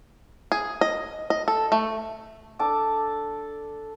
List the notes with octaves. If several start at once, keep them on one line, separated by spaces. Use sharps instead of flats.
G#4
D#5
D#5
A4
A3
D4 A4 A5 D6